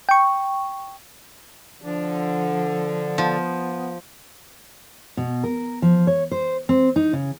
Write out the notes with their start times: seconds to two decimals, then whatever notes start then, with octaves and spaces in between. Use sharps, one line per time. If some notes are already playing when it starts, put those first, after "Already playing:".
0.09 G5 C#6
1.82 D3 F3
3.18 F3 B3
5.17 B2
5.44 A#4
5.82 F3
6.07 C#5
6.32 C5
6.69 C4
6.96 D#4
7.13 C#3